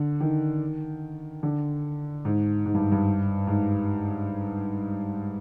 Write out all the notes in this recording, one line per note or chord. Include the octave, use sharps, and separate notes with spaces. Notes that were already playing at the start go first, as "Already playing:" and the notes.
Already playing: D3
D#3
D3
G#2
G#2
G2
G2
G#2